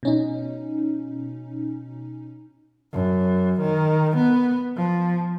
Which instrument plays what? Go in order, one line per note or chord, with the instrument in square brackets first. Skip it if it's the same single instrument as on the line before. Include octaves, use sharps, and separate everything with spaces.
[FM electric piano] B2 C#4 D#4
[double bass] F#2
D#3
B3
F3